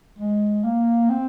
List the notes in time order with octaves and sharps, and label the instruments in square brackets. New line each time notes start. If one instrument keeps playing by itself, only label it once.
[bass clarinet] G#3
A#3
C4